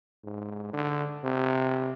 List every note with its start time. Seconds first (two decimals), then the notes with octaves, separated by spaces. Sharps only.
0.24 G#2
0.73 D3
1.24 C3